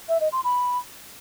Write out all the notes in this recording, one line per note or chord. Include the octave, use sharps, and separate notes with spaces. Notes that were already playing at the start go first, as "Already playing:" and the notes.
E5
D#5
C6
B5